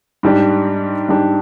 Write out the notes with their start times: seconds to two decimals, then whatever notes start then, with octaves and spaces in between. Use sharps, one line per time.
0.23 G#2 G3 D4 G4
1.09 G#2 G3 D4 G4